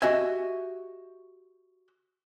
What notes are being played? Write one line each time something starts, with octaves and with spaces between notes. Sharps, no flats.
F#4 G4 D#5 E5 G#5